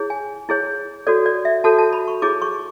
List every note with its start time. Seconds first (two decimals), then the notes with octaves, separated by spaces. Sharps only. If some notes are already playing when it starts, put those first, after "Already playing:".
Already playing: E4 G#4 C#5
0.10 G#5
0.49 E4 G#4 C#5
1.07 F#4 A4 C#5 D5
1.26 D5
1.45 E5
1.64 F#4 A4 C#5 A5
1.78 A5
1.93 B5
2.08 C#6
2.22 E4 G#4 C#5 D6
2.42 C#6